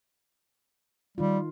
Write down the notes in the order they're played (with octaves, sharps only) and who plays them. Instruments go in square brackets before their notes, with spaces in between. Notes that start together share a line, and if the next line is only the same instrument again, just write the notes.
[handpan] D#3 D#4 F4 [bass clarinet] G3